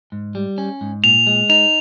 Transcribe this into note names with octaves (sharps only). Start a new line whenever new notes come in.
G#2
G3
C#4
G#2
A#2 F7
G#3
D#4 F7